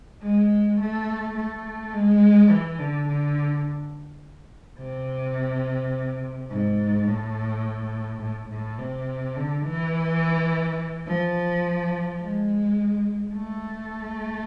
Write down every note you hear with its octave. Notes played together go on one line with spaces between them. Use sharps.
G#3
A3
A3
G#3
E3
D3
D3
C3
G#2
A2
A2
A2
C3
D3
E3
F3
G#3
A3